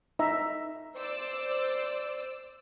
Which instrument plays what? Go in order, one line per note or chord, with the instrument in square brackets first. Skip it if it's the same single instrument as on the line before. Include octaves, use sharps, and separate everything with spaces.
[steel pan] D#4 E5 A#5
[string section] C5 D5 E6